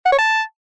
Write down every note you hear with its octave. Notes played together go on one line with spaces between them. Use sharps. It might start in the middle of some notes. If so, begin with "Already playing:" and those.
F#5
C#5
A5